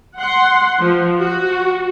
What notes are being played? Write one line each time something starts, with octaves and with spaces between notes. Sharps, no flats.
F#5 C6
F3
F#4